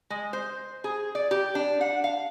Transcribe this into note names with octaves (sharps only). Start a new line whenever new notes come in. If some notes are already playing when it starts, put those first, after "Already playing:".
G#3
C5
G#4
D5
G4
D4
F#5
F5